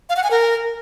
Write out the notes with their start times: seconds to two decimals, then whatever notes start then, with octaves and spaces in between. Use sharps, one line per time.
0.09 F5
0.16 F#5
0.24 G#5
0.31 A#4